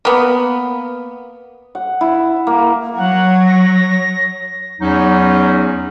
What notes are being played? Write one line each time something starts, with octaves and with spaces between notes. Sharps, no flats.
A#3 B3
F#5
E4
A#3
F#3 C#5 F#5
A#6
E2 F#3 C#4 D#4